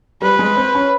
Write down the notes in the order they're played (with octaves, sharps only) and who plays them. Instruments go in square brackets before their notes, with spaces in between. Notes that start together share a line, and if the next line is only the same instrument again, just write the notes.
[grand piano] G3 [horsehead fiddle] B4
[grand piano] G#3
C4
C#4